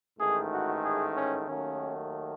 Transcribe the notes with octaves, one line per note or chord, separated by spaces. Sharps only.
A1 G#2 D#3 A3 G#4
F#4
G#4
C#4
D#2 D#3 F#3 A3 C#4